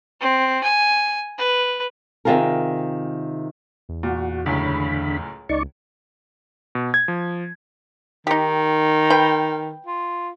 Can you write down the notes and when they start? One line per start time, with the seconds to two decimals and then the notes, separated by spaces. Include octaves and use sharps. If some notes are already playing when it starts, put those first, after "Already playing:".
0.20 C4
0.63 G#5
1.38 B4
2.25 C3 D#3 E3 F4 G#4 A#4
3.89 E2
4.03 A#2 F#4
4.46 C#2 F#2 A2 D3 B5
5.49 C#2 D#4 D5 C#6
6.75 B2
6.94 G#6
7.08 F3
8.27 D#3 D#4 G4
9.10 B4 G5
9.86 F4